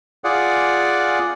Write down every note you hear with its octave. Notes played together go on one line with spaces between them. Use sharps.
F4 G#4 D5 F#5